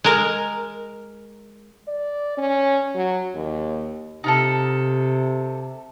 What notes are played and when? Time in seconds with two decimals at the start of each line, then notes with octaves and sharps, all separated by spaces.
0.04 G#3 A#4
1.88 D5
2.38 C#4
2.95 F#3
3.35 D#2
4.24 C3 D#4 F4 A4